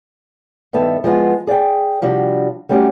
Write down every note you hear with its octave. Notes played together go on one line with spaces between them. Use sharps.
G2 D#3 B3 A4 E5
F3 G#3 B3 F4
G#4 D5 F5 G5
C3 F3 G3 D4 F#4
G3 A3 C#4 F#4 G4 D5